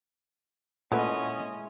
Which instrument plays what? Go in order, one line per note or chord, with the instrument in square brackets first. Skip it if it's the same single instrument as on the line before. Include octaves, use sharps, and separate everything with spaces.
[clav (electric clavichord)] A#2 A3 B4 [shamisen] F#3 [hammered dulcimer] G#3 E4 [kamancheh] C#4 D#5